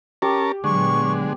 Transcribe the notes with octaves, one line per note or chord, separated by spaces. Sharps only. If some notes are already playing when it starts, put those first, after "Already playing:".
C#4 G4 A#4 A5
A#2 D3 F#3 G#3 B3 C#6